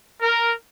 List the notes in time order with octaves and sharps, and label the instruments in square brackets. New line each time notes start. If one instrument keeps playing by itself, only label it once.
[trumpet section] A#4